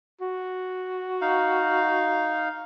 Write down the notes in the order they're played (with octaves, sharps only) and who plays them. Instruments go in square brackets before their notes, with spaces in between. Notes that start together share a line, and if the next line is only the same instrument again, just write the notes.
[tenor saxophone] F#4
[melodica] D#4 F5